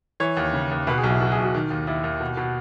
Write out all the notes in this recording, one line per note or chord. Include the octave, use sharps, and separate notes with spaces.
E3 C#5
D#2
C#3
D#2
B2 B4
G#4
B1
E4
B2 F#4
G#4
B1
F#4
D#3
D#2
D#2 E4
D#2
B2
B2